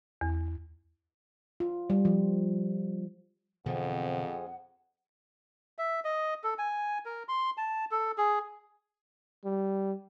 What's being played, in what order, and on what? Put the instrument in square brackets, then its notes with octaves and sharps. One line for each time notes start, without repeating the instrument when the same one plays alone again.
[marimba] E2
[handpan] F4
G3
F3
[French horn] F2 [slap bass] B2 D3 E3 [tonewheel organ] C4 G#4 [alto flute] F#5
[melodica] E5
D#5
A4
G#5
A#4
C6
A5
A4
G#4
[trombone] G3